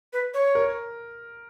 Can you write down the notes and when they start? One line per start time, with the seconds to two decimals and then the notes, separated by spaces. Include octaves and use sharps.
0.13 B4
0.34 C#5
0.55 A#4